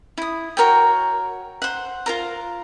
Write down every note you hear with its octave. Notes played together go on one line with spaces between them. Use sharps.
E4 D#6
F#4 A#4 C#5 G5
C5 F#5
F4 A#4 A#5